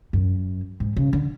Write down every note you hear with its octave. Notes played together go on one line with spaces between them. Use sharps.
F#2
G#2
C#3
D3